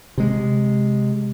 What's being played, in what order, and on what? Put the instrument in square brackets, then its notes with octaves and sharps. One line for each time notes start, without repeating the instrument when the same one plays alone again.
[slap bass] C3 G#3